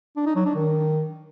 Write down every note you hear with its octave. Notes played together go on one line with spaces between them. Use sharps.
D4
D#4
F#3
D4
D#3